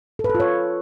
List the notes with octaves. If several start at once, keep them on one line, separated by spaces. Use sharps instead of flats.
A4
B4
A4
F4
C#5